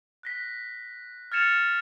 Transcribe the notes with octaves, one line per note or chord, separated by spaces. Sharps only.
F#6 A#6 B6
F6 G#6 A6 C#7 E7 F7